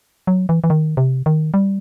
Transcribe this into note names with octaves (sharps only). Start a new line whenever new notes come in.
F#3
E3
E3
D#3
C3
D#3
G3